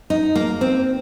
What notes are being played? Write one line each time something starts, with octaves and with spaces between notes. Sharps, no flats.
D#4
A#3
C4